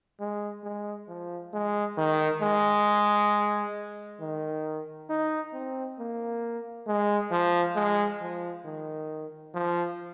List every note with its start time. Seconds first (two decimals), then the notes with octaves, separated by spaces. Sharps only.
0.20 G#3
0.64 G#3
1.08 F3
1.53 G#3
1.97 D#3
2.42 G#3
4.20 D#3
5.10 D#4
5.53 C4
5.99 A#3
6.87 G#3
7.31 F3
7.76 G#3
8.21 F3
8.65 D#3
9.55 F3